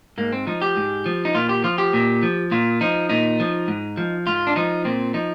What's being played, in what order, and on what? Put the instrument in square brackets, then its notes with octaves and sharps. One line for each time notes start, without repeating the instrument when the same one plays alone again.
[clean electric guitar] G#2 A#3
C4
F3 D#4
G4
G#2
F3
D#4
A#2 F4
G4
F3 F4
G4
A#2
F3
A#2 F4
F3 D#4
A#2 D#4
F3
G#2
F3
G#2 F4
D4
F3 D#4
A#2 C4
F3 D#4